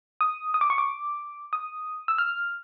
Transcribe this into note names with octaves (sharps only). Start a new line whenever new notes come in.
D#6
D#6
D6
C#6
D6
D#6
E6
F6